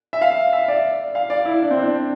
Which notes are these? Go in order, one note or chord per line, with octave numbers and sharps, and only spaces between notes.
E5
F5
E5
D5
F5
D5
E4
D4
C4
D4